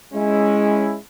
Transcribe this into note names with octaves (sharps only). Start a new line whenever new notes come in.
G#3 C#4 E4